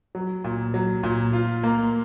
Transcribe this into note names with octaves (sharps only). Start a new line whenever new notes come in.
F#3
A#2
F#3
A#2
F4
A#3